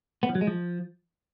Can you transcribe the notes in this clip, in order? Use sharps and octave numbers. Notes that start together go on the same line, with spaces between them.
B3
F3
F#3
G#3
F3